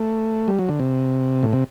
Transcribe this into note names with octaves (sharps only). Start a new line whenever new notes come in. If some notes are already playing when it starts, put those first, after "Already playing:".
Already playing: A3
G3
F#3
D3
C3
A2
C3